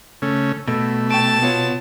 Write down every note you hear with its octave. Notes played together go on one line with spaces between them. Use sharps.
C#3 A3 C#4
B2 A3 E6
G5 A5 C#6 D7
B3 F4 C#5